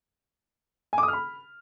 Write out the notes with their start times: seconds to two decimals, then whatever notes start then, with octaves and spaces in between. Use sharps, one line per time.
0.93 G#5
0.98 D6
1.03 D#6
1.08 F6
1.13 B5